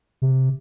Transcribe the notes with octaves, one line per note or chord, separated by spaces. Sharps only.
C3